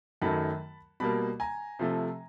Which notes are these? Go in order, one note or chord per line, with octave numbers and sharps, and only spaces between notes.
F#2 D#3 F#3 A3 A5 B5
B2 G3 A#3 A5 B5
G#5 A#5
C3 F3 A3